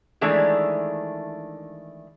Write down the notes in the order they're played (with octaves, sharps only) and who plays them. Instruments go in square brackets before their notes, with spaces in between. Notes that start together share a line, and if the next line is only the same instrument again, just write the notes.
[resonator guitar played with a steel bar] D#3 E3 G#3 A3 D4